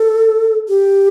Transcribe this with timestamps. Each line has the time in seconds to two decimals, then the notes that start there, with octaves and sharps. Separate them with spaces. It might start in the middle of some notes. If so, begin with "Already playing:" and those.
Already playing: A4
0.68 G4